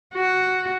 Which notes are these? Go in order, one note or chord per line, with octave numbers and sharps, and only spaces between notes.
F#4